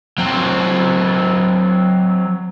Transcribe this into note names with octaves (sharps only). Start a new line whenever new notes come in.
F#3 C4